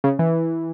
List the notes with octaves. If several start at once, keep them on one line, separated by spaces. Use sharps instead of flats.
C#3
E3